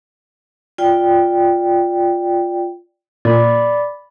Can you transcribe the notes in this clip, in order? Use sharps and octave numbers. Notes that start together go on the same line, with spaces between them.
F4 D5 G5
A#2 D5 B5